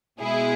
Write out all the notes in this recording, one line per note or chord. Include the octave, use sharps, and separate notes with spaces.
B2 G#3 E4 G#4